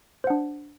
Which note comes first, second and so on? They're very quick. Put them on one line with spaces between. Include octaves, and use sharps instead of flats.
C5 F#5 D4